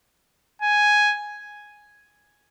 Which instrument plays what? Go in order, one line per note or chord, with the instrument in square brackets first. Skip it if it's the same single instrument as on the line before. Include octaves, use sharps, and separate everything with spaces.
[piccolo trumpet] G#5